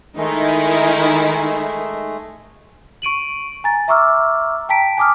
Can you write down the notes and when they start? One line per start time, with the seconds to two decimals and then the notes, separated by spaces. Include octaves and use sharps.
0.17 D#3 G#3 A3 D#4 E4 G#5
3.02 C#6 D7 D#7 F#7
3.64 G#5 A#5 A6
3.88 E5 A#5 C#6 D6 E6 F6
4.69 G5 A5 A#5 B6 D7
4.97 G#5 A5 D6 D#6 F6